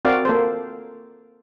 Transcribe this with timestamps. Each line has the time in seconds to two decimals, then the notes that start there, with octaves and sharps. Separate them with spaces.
0.05 C4 F#4 A#4 D5 F5
0.25 A#3 A4 C5